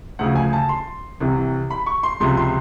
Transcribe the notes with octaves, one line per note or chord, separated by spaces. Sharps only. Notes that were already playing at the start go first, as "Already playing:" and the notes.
D2 C#3 F3 F#5
G#5
A5
C6
C2 C3 E3
B5
C#6
C6
C#2 C3 F3 C6
C6